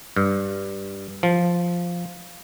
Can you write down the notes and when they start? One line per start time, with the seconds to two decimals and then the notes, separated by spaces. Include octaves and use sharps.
0.16 G2
1.23 F3